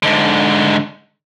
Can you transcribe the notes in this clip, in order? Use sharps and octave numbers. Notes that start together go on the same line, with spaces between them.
G#2 D3